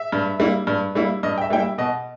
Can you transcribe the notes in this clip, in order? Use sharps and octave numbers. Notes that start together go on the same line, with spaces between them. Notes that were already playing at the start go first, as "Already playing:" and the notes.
Already playing: E5
G2
G3 A#3 E4
G2
G3 A#3 E4
G2 D#5
G5
E5
G3 A#3 E4 G5
E5
B2 D#5